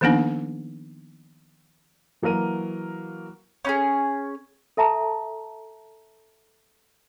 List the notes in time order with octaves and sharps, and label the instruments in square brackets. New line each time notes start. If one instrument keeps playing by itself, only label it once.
[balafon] D#3 F3 A#3 B3 D4 D#4
[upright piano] E3 F#3 A#3 A#4 D#7
[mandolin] C#4 D#4 G#4
[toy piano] A4 E5 A5 A#5